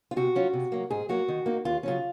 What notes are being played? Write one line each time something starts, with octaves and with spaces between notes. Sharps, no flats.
F4
C3 F#4
F#3 C#4 F4
C3
F#3 A#3
G#2 G#4
F#3 A#3 F#4
D#3
A#3 D#4
D#2 F4
C#3 F#3 C#4 F4